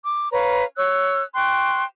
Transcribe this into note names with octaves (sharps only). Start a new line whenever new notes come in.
D6
B4 C#5 F5 A#5
C#5 E6 F#6
G5 C6 C#6 F#6